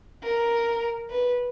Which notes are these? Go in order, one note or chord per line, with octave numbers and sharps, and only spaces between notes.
A#4
B4